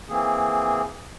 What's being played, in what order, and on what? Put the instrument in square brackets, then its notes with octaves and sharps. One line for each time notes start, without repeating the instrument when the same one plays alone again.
[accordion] E3 A#3 C4 G#4